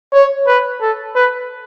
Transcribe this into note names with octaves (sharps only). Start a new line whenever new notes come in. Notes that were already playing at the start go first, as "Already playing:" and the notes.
C#5
B4
A4
B4